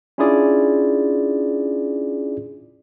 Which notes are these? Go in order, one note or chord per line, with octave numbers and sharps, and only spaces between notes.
C#4 D4 E4 F4 G#4 D5